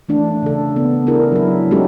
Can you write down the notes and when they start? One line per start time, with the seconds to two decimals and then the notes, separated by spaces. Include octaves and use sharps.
0.09 E3 A3 D4
0.43 C#3 A4
0.76 B3
1.07 D4 E4 G#4 A#4
1.32 F#3 E4
1.71 G#3 C#4 D#4 F#4 G4 A4